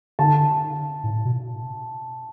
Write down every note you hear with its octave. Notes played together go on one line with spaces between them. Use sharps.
D3 A5
A2
B2